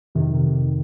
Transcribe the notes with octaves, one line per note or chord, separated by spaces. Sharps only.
F2 C3 D#3